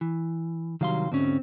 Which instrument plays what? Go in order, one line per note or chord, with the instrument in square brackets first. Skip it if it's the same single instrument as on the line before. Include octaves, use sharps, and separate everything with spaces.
[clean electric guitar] E3
[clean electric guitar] C2 F5 C6 [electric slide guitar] D#3 F#3 G3
[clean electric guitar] D2 G#2 C#4 [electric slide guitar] C4